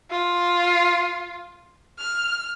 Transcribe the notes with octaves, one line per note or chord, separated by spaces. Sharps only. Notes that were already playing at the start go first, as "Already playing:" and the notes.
F4
F6